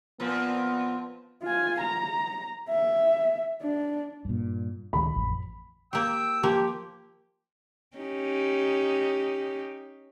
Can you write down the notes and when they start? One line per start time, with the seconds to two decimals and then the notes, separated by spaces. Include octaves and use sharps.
0.20 A#2 F3 B3 C4
1.43 F4 G#5
1.80 A#5
2.69 E5
3.62 D4
4.25 G2 A#2
4.93 D1 D#3 G#3 B5
5.15 A1 F2
5.93 A#3 G4 G5 E6
6.43 F3 A#3 G4
7.97 C#4 D#4 G4